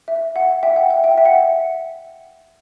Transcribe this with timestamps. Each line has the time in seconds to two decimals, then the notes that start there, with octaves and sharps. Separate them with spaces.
0.08 E5
0.36 F#5
0.63 E5 G5
0.76 F#5
0.90 E5 G5
1.04 E5 G5
1.18 E5
1.25 F#5